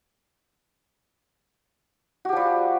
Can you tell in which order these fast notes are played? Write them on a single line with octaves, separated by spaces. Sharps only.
F#4 G4 F3 G3